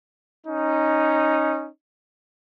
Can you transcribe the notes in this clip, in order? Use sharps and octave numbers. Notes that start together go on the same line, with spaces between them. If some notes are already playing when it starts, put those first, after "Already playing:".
C#4 D#4